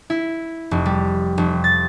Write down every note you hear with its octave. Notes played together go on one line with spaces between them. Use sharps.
E4
F1
G3
F1
A6